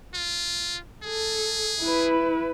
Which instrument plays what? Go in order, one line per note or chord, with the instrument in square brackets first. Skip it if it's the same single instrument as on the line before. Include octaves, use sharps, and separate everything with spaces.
[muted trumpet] F4
[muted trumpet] G#4 [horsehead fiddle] A4
[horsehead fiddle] E4 B4